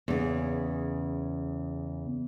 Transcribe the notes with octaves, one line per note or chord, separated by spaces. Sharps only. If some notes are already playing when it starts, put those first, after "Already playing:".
E2 C#3